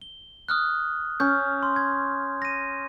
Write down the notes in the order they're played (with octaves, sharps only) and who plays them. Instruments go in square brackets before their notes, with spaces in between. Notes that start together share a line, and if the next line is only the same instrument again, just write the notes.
[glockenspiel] G7
D#6 F6 F#6
[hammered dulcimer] C#4 [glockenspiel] G6
[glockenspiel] C6
G#6
A#6 D#7